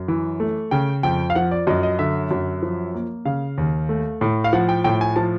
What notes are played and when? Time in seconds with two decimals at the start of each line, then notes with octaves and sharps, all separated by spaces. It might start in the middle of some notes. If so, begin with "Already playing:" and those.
Already playing: F#2
0.08 E3
0.40 A3
0.71 C#3 G5
1.03 F2 G5
1.30 F5
1.35 F3 F#5
1.51 D5
1.67 F#2 D#5
1.83 D#5
1.99 D3 E5
2.31 F#2
2.63 F3
2.94 A#3
3.25 C#3 F5
3.58 D#2
3.89 A3
4.21 A2
4.44 F5
4.53 F3 F#5
4.69 G5
4.84 A2 G5
5.01 G#5
5.16 F3 A5